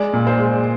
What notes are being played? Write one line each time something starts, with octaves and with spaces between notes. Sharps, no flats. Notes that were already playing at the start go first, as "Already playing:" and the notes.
Already playing: G#3 D5
A#2
C5
G#3